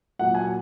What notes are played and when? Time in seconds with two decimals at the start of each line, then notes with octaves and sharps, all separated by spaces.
0.19 A#2 F#3 A#3 F#5
0.35 G#5